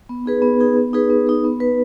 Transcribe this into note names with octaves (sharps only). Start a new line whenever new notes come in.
B3
D#4 G#4 B4
B3
D#4 G#4 B4
B3
D#4 G#4 B4
B3
D#4 G#4 B4
B3
D#4 B4